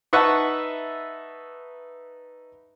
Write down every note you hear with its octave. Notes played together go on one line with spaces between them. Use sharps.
D#4 B4 E5 F#5 A5 C#6